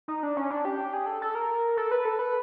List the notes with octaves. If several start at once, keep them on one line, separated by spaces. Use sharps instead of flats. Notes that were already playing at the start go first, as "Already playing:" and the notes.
D#4
D4
C#4
D4
G4
G#4
A4
A4
A#4
A4
B4
A4
B4